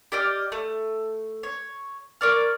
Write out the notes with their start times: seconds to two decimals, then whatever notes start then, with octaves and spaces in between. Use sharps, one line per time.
0.12 G4 D5 D#5 F6
0.52 A3
1.43 C#5
2.21 A#4 C#5 D5 F6